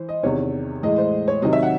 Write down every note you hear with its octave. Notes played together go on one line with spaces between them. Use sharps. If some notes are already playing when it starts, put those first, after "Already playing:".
Already playing: E3 C5
D#5
E2 C3 D#3 C#5
A2 E3 G#3 D#5
C5
C#5
C3 D#3 F#3 D#5
E5
F#5